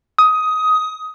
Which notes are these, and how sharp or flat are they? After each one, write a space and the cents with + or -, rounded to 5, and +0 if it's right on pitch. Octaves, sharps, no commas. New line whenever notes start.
D#6 +15